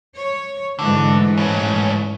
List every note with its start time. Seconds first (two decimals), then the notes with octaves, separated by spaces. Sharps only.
0.16 C#5
0.79 G#2 D3 E3 A3
1.38 A2 C#4